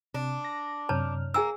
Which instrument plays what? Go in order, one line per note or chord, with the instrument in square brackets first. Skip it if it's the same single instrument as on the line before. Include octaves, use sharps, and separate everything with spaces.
[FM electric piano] C3 [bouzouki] D4
[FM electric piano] A#6
[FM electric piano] F#2 C3 F6 [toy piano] C#5 A5 A#5
[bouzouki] A#3 [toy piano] G#4 G#5 E6